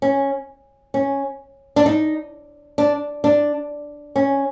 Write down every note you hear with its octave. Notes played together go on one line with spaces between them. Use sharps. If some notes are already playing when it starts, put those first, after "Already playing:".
C#4
C#4
D4
D#4
D4
D4
C#4